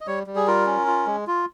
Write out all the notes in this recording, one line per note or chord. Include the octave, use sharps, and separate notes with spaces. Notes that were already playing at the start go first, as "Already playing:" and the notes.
D#5
G3 C#5
G3
G#4
F4 A#4
C#4
F4
G#3
F4